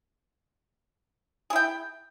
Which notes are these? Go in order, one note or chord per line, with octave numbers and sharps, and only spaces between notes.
E4 G#4 G5